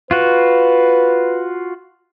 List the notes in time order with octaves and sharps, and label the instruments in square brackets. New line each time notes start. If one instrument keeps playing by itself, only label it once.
[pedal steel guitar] F4 F#4 [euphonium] B4